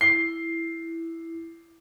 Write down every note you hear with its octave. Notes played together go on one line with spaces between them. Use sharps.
E4 C7